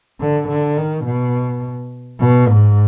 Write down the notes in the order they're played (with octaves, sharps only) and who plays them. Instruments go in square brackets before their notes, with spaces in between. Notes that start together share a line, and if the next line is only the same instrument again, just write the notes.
[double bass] D3
D3
D#3
B2
B2
G#2